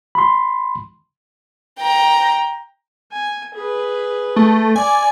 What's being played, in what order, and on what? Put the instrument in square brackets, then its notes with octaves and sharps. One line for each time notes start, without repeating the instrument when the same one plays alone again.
[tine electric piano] B5 C6
[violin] G5 A#5
[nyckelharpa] G#5
G#4 B4
[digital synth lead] A3
[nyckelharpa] D5 [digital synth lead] G#5